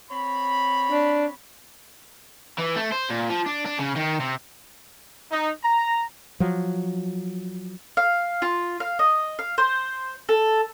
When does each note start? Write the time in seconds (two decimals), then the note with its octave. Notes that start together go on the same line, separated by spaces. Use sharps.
0.10 C4 C#5 B5
0.91 D4
2.58 E3
2.76 A3
2.92 C5
3.10 A#2
3.30 F3
3.46 D4
3.66 D4
3.79 C#3
3.96 D#3
4.20 C3
5.31 D#4
5.64 A#5
6.40 F3 F#3
7.97 F5
8.42 F4
8.80 F5
8.99 D#5
9.39 F5
9.58 C5
10.29 A4